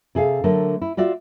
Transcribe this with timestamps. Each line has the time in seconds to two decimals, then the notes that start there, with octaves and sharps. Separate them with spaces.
0.15 C3 G#4 A4 F5
0.44 D3 F#3 A3 A#4
0.82 E4
0.97 F4 F#4 D5 E5